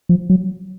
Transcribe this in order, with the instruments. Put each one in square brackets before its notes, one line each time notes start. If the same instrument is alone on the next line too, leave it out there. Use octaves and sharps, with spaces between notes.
[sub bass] F3
F#3